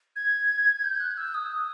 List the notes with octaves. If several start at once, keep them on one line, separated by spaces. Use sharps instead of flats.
G#6
G6
F#6
E6
D#6